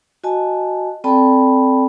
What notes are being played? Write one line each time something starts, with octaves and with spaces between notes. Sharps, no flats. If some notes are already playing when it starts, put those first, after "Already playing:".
F#4 D#5 G#5 A5
C4 A4 D5 G5 A5 B5